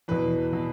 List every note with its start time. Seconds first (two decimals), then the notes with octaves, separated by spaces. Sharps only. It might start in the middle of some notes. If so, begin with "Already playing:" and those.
0.08 E2 B2 B4
0.53 B2